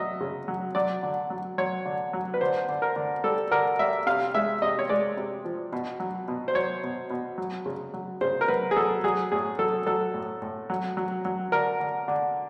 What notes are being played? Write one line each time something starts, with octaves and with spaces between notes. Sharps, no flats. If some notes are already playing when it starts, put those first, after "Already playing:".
Already playing: F#3 D#5 E5
C#3
F#3
F#3 D5
D3
F#3
F#3 C#5
D3
F#3
B4
D3 C5
D3
A#4
D3
G3 A4
D3 A#4
G3 E5
C3 F5
G#3 E5
C3 D#5
C#5
G#3 D5
C3
F3
B2
F#3
B2
C5
F#3 C#5
B2
B2
F#3
C#3
F#3
C#3 C5
A#4
F#3 B4
G#4
F#3 A4
F#3 G#4
A2 G#4
F#3 A4
F#3 A4
A2
A2
F#3
F#3
F#3
D3 A#4
D3
D3